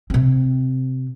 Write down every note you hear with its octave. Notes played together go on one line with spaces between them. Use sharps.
C3 C4